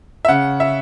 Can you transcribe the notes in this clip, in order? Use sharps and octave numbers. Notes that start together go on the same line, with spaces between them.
E5
C#3 F#5
E5